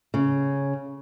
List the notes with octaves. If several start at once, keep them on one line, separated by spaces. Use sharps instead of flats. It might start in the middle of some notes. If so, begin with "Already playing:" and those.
C#3